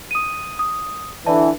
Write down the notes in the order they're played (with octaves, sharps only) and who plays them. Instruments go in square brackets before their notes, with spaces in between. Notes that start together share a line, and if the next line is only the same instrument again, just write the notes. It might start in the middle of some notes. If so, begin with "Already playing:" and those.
[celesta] D#6 D#7
D#6
[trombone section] D3 E3 [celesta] D5 E5 A5